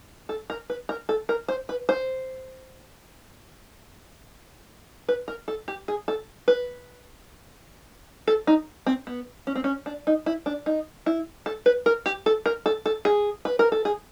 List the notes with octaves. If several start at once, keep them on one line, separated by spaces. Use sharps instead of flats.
A4
A#4
B4
A#4
A4
A#4
C5
B4
C5
B4
A#4
A4
G4
G#4
A4
B4
A4
D#4
C4
B3
C#4
C4
C#4
D4
D#4
E4
D4
D#4
E4
A4
B4
A#4
G4
A4
A#4
A4
A4
G#4
B4
A#4
A4
G#4